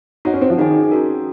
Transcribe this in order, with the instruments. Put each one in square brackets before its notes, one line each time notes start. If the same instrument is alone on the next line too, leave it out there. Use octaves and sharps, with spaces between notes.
[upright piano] D#4 [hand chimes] F#4 C#5 F#5
[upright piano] C#4
C4
F3
[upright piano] D#3 [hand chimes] D#4 G#4 D#5 G#5
[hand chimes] C#4 F#4 A#4